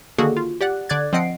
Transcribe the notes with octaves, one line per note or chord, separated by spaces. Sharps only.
D3 D#3 A#3 F#4 G#4 A4
F4
G4 D5 F#5 F#6
D3 D5 D6 F#6 G#6 A6
F3 C4 D#5 F#5 C7 D7